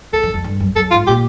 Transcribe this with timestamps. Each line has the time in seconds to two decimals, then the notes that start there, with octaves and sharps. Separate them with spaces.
0.13 E2 A4
0.23 F2
0.34 F2
0.44 G2
0.60 F#2
0.76 F#2 A4
0.91 G#2 F4
1.07 A#2 G4